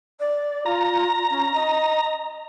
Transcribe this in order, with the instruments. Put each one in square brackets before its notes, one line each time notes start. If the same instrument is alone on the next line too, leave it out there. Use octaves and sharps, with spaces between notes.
[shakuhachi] D5
[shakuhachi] F4 [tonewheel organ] A#5
[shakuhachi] C#4
D#5